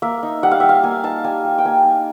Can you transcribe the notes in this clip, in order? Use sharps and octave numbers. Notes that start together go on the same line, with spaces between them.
A#3 E5
D#4
G3 F#5
F5
G3 E5
F5
A#3 G#5
D#4 A5
G3 G#5
G3
G5
A#3 G#5
D#4